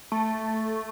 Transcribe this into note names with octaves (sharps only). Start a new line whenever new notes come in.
A3